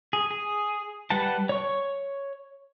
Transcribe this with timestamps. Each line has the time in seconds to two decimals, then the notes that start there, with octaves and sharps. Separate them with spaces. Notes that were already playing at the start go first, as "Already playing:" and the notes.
0.13 G#4
0.31 G#4
1.10 G3 B4 F#5 G5 A5
1.49 C#5 C#6